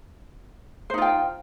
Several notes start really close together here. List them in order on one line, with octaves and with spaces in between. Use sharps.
C5 D#4 F4 G5